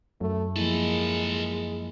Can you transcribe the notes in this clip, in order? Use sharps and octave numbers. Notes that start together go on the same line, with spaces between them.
F#2 A3
F3 G#3 A#3 E4 A4 B4